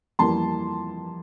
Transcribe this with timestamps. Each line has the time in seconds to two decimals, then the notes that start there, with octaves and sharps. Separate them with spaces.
0.19 F2 E3 G3 A#3 A5 C6